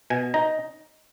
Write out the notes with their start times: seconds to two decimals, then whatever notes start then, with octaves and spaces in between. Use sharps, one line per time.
0.10 B2 G#5
0.34 D#4 A#5